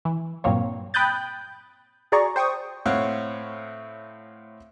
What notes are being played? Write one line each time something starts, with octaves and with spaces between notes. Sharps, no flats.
E3
G2 A#2 F#3 A#3 C4 C#5
G5 B5 D#6 F#6 G6 A6
F#4 G#4 D5 A#5 C#6
C5 G5 C#6 D#6
A2 C4 C#5 F5 F#5